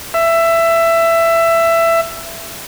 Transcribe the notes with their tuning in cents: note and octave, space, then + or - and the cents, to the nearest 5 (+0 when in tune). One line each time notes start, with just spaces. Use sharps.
E5 +15